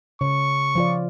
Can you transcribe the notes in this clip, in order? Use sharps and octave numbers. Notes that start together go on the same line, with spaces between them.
C#3 C#5 C#6
F3 F4 D5